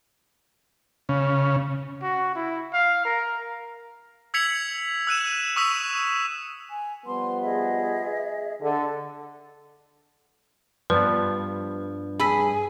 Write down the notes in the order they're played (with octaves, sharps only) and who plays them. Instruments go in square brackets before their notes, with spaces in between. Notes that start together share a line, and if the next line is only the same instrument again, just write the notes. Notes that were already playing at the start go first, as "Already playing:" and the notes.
[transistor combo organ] C#3
[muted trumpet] F#4
E4
F5
A#4
[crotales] E6 G#6 B6 C#7 F7 F#7
E6 F#6 D#7 E7
C#6 D#6 E6 B6 E7 F7
[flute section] G#5
[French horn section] F3 G3 B3 [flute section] C6
[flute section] G#4 D#5 E5
[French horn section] D3 [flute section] A4
[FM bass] G2 [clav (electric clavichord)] F3 B3 [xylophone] B4 D5
[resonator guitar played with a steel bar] G#4 [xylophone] B5 E6 B6